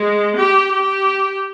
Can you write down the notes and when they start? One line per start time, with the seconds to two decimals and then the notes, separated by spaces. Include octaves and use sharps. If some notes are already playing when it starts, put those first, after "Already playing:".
Already playing: G#3
0.37 G4
0.72 G4